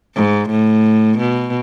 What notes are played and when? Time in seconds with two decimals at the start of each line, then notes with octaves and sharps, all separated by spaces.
0.15 G#2
0.50 A2
1.19 B2